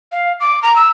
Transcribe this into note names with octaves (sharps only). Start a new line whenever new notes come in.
F5
D6
A#5
E6